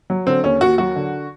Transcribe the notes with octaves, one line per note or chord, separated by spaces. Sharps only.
F#3
D3 C4
D#2 C#4
D#2 F#4
F#3 F#4
D3